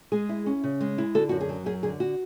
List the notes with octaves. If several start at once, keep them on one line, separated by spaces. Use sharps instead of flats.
G#3 G#4
E4
C#4
C#3
G#3
E4
D3 F#4 A4
F#2 F#4
G#4
F#3
F#2 G#4
D3 G#4
F#4